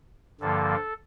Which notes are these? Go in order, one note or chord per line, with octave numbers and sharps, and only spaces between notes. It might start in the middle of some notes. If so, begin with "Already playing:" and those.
G2 D3 F3 A#3 A4